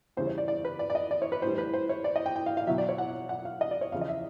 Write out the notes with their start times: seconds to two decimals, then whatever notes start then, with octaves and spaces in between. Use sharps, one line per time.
0.17 E2 C#3 E3 G3 C5
0.27 C#5
0.38 D5
0.48 D5
0.65 B4
0.79 D5
0.90 D5
0.95 D#5
1.11 D5
1.22 C#5
1.32 B4
1.42 A2 E3 G3 C5
1.58 B4
1.74 C5
1.89 C#5
2.04 D5
2.16 D#5
2.26 G5
2.36 G5
2.46 F5
2.57 F5
2.67 B2 F#3 E5
2.78 D5
2.89 C#5
2.98 F#5
3.29 F#5
3.45 F5
3.61 D#5
3.71 D5
3.81 C#5
3.92 E2 C#3 F3 F5
4.01 D#5
4.08 E5